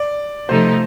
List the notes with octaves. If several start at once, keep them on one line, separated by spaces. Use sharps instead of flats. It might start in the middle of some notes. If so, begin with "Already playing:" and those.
Already playing: D5
C3 F3 A3 D#4 C5